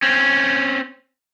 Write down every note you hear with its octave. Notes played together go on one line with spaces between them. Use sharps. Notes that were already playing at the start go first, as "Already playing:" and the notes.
C4 C#4